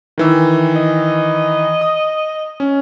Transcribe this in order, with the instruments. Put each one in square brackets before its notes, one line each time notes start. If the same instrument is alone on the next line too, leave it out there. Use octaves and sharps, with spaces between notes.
[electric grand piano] D#3 E3 E6
[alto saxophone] D#5
[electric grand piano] D#6
C#4